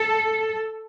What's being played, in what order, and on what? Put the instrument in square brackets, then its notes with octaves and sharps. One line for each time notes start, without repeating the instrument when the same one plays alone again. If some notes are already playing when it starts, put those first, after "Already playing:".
Already playing: [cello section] A4